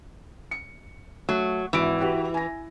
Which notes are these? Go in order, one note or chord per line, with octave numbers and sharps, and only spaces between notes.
C#7
F#3 A3
G#1 E3 F#4 D7
F#4 G4 B4
G#5 A#6